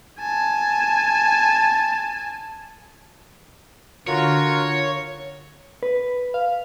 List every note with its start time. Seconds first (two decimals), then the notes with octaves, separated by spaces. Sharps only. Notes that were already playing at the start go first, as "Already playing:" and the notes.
0.20 G#5 A5
4.07 D3 F4 F#4 A#4 C#5
5.83 B4
6.34 F5